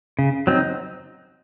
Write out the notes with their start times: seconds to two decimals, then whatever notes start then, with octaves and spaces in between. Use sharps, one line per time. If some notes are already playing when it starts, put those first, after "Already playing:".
0.19 C#3
0.47 F#3 C4 D#4